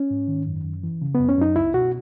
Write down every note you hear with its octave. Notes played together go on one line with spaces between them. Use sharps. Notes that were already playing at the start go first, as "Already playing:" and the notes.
Already playing: C#4
G#2
D#3
F#2
F#2
E3
C#3
F#2 B3
C#4
F#2 D#4
C#2 E4
B2 F#4